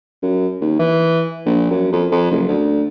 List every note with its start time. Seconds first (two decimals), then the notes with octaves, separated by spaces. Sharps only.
0.23 F#2
0.61 D#2
0.79 E3
1.46 A#1
1.71 F#2
1.92 F2
2.12 F2
2.31 F#1
2.49 D2